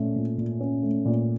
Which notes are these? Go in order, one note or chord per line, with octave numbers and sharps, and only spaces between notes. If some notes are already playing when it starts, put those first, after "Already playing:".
Already playing: A#2 A3 C#4
A#2
A#2
C#4
A3
A#2